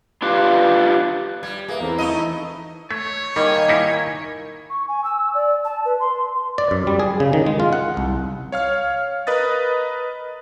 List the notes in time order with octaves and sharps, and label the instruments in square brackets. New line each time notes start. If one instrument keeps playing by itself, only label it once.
[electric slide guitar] D4 F4 G4 B4 F5
[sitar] G3 [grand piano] G#6
[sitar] A#3 [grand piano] G#4 E5 [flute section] B4
[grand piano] E2 C4 B4 [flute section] E4 A4 A#5
[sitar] A3 D#5 [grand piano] B5 C#6
[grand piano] E3 D#4
[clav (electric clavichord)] A3 [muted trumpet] C#5
[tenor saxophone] D#3 [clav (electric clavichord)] G3 [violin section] A#3 G#5 G#6
[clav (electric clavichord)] G3 D#4 E4
[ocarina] C#6
G#5
E6
D5
A5
B4
C6
[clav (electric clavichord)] D5
F#2
G3
G#4
C#3
D#3
G#3
F4
F#5
C2
[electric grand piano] C#5 F5 F6
A#4 B4 D#5 D#6 A6